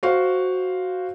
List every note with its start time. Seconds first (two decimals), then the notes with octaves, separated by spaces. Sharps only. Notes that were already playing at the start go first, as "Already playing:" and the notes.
0.03 F#4 C5 F5